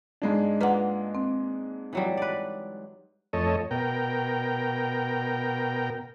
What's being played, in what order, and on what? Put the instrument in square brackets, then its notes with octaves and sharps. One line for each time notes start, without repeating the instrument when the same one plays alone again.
[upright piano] G#2 G#3 D4
[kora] A#3 F4 [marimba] B4 F#5
[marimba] C4
[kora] E3 F#3 G3
B4 D5
[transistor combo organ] F2 A3 A4 C#5 D#5
B2 A#4 G5